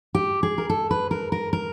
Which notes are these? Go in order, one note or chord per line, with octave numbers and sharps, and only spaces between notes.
G4
G#4
A#4
A4
B4
A#4
A#4
A#4